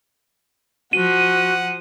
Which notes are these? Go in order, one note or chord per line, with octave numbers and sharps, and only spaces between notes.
F3 F#4 F#5 D#7